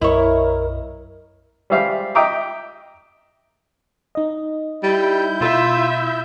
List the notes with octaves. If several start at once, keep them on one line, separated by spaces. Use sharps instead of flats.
B1 F#2 E4 A#4 C#5 D#5
G3 G#3 C5 E5 F5
D#5 E5 G5 A#5 D6 D#6
D#4 D#5
G3 E4 G6
B2 F4 E5